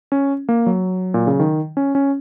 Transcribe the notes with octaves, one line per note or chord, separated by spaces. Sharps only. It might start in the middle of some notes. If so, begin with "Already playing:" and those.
C#4
A#3
F#3
A#2
C#3
D#3
C#4
C#4